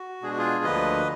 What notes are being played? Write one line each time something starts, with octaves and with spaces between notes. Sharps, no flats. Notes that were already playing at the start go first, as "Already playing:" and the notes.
Already playing: F#4
B2 G#3 D4 G#4
F#4
F4 G#4
D2 D3 F3 A#3 B4 D#5